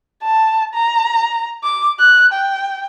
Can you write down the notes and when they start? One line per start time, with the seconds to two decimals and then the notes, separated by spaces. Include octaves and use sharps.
0.23 A5
0.74 A#5
1.64 D6
1.99 F#6
2.33 G5